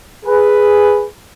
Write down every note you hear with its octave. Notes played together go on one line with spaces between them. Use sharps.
G#4 B4